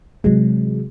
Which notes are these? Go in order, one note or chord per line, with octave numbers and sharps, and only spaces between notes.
C3 E3 F#3 G#3